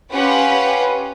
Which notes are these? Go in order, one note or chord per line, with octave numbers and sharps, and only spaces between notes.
C#4 F4 G4 B4 F#5